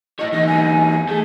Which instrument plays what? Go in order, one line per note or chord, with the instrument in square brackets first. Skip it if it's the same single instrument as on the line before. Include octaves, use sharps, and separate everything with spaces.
[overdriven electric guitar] E4 C#5 [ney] D#5
[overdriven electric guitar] E2 D#4 [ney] D#5
[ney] G#5
[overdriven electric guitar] A3 [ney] G#4